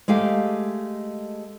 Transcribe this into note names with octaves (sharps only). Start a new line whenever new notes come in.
G#3 A3 G4 F5